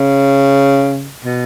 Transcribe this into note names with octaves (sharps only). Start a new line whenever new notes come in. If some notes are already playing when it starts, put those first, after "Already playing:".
Already playing: C#3
B2